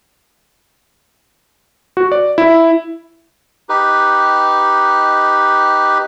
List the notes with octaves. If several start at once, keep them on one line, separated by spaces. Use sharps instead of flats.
F#4
D5
E4
D#4 G4 B4